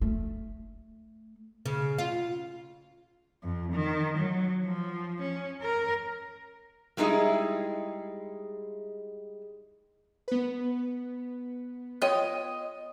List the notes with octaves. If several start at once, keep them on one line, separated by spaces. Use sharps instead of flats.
A3
C#3
F4
F2
D#3
F#3
F3
C#4
A#4
G3 G#3 D#4 E4 G#4
B3 B4
F4 C#5 D#5 G5